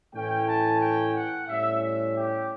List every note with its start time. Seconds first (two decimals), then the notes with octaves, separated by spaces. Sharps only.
0.14 A2 E3 A3 C#4 G5
0.48 A5
0.81 G5
1.14 F#5
1.48 A2 G3 C#4 E5
1.82 E5
2.15 G4